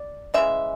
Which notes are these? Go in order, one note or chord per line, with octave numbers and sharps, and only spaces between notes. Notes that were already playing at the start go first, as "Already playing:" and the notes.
Already playing: D5
C#3 E3 G#3 E5